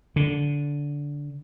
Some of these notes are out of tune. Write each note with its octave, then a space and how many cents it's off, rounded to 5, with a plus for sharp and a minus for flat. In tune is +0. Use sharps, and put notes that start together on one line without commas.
D3 -15